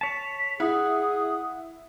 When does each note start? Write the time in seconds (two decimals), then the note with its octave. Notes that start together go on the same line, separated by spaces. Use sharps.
0.01 C#5 A5 B6
0.60 E4 G#4 F#5 D#6